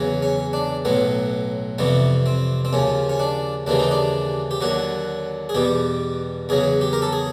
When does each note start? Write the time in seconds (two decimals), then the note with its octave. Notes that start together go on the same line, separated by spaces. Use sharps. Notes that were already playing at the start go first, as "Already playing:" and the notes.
Already playing: E2 C#3 F#3
0.22 C#4
0.53 D4
0.85 B1 A2 F#3 B3
1.79 F2 C3 E3 G3 B3
2.26 C4
2.65 C4
2.73 D#2 C#3 F3 C#4
3.10 C#4
3.20 D4
3.67 D#2 C#3 E3 G3 D4
3.79 D#4
3.91 D4
4.51 G4
4.61 D#2 D3 F#3 F#4
5.49 G#4
5.55 E2 B2 G3 G4
6.49 E2 C#3 F#3 G#4
6.81 G4
6.93 A#4
7.02 A4
7.12 G#4